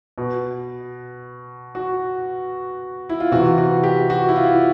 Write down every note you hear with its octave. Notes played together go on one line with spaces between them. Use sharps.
B2
F#4
E4
F4
C3 E3 F#4
F#4
G4
F#4
E4
F4